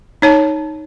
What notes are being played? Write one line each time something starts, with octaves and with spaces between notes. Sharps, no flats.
D#4 C#5 A5